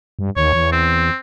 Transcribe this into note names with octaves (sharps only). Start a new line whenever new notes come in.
G2
D#2 C#5
E2
C4